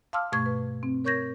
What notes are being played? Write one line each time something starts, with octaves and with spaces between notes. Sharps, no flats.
F5 A5 C6 D6 E6 F6
G2 B2 A3 C#6 G#6
B4
C4
A#4 C#5 C#6 G6 G#6 A#6